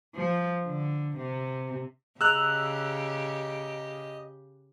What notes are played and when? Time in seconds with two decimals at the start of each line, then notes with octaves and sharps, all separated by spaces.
0.15 F3
0.66 D3
1.17 C3
2.21 C#3 G4 G#4 D#5 A#5 E6 F#6 F7